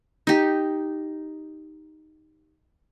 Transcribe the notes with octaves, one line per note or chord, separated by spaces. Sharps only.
D#4 G4